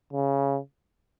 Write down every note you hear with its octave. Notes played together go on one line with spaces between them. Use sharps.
C#3